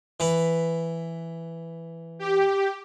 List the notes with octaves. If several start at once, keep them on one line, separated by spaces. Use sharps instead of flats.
E3 B4
G4